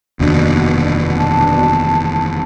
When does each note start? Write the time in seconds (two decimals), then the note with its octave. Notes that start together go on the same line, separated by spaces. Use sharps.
0.19 F1 D#2 B2 D4
1.16 A5